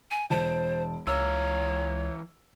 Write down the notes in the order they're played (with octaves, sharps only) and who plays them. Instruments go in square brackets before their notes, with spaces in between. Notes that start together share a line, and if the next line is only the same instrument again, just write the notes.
[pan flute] G#5
[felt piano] E1 A5 D7 [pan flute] C5
[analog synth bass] C#2 [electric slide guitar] E3 F5 A#5 [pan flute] C#5 [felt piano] E6